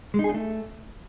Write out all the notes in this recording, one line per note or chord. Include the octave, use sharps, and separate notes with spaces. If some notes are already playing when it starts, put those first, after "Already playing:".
G#3
D#4
G#4
D#4
A3